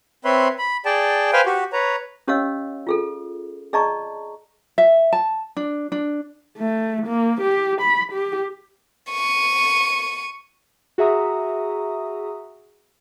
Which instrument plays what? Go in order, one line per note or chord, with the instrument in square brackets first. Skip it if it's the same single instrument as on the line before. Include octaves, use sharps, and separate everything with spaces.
[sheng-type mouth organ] C4 B4 C#5 E5 B5 C6
B5
G#4 D5 G5 A5
B4 C5 F5 G5 G#5
F#4 G4
B4 C#5 A#5
[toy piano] C#4 G4 C#5 D#5 F5 E6
F4 G#4 A4
G#4 D5 D#5 A5 A#5 C#6
[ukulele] E5
A5
D4
D4
[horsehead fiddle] A3
A#3
G4
B5
G4
[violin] C#6 D#7
[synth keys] F#4 G#4 E5 A#5 D#6